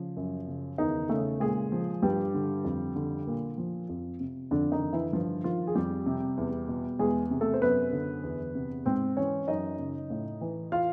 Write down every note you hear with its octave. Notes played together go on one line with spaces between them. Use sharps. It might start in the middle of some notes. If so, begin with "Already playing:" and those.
Already playing: C#3 F3
F#2
C#3
E2 D#3 D#4
C#3 A3 A4
A#2 G#3 G#4
F3
G2 G3 G4
D3
F2
D3
A#2
F3
F2
C3
F2 D3 D4
D#3 D#4
D3
E3 E4
G2 F3 F4
D#3 F3 F4
G#4
F2 G3 G4
C3
E2
B2
E2 G#3 G#4
C3
A3 A4
C5
F#2 B3 B4
D3
E2
C3
G#2 C4 C5
E3 C#4 C#5
F#2 D#4 D#5
C#3
A2
E3
F4 F5